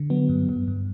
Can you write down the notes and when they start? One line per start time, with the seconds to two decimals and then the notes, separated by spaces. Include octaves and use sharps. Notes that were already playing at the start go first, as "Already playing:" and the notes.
Already playing: D3
0.10 F#3 B3
0.29 G2
0.49 G2
0.68 G2